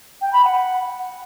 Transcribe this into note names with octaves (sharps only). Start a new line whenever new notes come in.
G5
B5
F#5